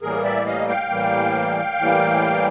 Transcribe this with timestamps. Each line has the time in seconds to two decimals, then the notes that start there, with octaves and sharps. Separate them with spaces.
0.02 A2 E3 G3 A#3 G#4 A#4
0.24 D5 E5
0.46 D#5 F5
0.68 F5 G5
0.90 A2 E3 G3 A#3
1.79 A2 E3 G3 A#3